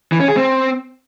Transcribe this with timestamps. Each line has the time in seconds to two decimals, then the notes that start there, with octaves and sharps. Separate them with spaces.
0.12 E3
0.20 C#4
0.28 G#4
0.36 C4